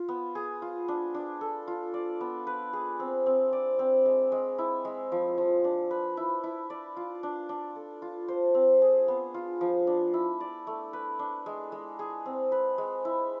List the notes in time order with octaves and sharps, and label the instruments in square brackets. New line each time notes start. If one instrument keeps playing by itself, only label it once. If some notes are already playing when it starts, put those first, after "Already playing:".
Already playing: [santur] F4
B3
G#4
F4
D4
D4
A4
F4
D5
B3
B4
G#4
C4
C4
D5
C4
G#3
G#3
E4
G#3
F3
F3
D4
B4
E4
E4
D5
F4
D4
D4
A4
F4
C5
C4
G#4
B3
F4
F3
D4
E4
D5
A3
B4
D4
G#3
G#3
G#4
C4
B4
G#3
E4